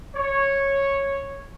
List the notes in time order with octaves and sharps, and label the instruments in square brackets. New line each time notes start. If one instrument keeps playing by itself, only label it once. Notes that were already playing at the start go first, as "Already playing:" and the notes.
[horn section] C#5